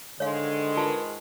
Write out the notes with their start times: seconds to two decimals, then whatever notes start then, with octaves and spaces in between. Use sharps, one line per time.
0.20 G#2 D3 D#3 G#3 C#5 F5
0.77 F4 G#4 A#4 B4 A5